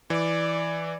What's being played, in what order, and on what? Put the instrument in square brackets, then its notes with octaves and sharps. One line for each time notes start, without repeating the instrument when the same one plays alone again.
[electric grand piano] E3 [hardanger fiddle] D5